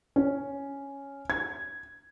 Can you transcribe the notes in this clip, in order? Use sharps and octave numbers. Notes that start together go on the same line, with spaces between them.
C#4
G#6